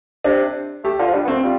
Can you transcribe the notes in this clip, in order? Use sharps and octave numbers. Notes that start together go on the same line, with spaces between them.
C3 D4
A3 G4
D3 F4
F3
G3 D4
B3
A3 C4
G3 F4